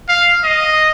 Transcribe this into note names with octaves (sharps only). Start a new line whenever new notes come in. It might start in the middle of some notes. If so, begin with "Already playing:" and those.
F5
D#5